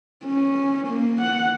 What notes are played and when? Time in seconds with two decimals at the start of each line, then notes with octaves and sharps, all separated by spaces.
0.25 C#4
0.87 A#3
1.21 F#5